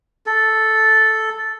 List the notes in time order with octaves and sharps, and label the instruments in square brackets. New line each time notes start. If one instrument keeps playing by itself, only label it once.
[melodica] A4